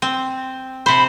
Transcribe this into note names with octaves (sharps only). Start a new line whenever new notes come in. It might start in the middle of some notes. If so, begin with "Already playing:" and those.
C4
C3 C5 B5